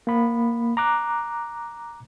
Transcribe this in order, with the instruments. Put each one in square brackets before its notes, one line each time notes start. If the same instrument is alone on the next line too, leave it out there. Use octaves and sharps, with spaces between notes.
[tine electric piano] A#3 B5
A#5 D6 F#6